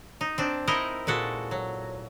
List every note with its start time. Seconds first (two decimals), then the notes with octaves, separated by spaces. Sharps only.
0.21 D#4
0.38 C4 D4
0.67 D#4 E4 A#4 D#5
1.07 A#2 G#3 F#4 A4
1.51 F#3